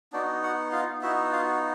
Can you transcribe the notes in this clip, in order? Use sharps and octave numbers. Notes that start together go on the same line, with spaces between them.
B3 D4 D#4 F#4 D5
F#4 F#5
F4 F5
B3 D#4 E4 F#4 E5
F4 F5